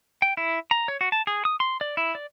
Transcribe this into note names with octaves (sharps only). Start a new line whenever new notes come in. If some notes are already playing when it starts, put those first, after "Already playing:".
G5
E4
A#5
C#5
F#4
A5
G#4
D#6
C6
D5
E4
D5